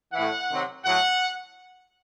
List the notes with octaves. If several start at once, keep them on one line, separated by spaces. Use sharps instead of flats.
A2 E3 F#5
C3 D#3 F#3
A2 F#3 F#5